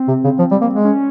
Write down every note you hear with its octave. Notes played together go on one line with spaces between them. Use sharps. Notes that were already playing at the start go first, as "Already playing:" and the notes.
Already playing: C4
C3
C#3
F3
G3
A#3
G#3
C#4